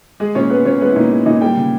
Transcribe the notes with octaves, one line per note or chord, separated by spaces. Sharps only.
G#3 G#4
A#2 C#4 C#5
G#3 B3 B4
A#2 C#4 C#5
G#3 B3 B4
E4
A#2 D#4
G#3
A#2 D#4 D#5
G3 G4 G5
C#3